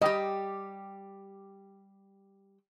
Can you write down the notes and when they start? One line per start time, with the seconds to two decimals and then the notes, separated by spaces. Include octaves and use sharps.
0.02 G3 G4 D#5 G5